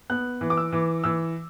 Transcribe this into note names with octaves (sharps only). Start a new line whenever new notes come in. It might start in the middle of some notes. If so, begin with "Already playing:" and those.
B3 F#6
E3
D6
E6
E3
E3 E6